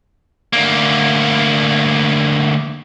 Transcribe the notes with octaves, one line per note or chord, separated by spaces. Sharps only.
D2 A#3